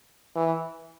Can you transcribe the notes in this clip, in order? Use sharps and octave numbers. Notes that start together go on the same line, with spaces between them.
E3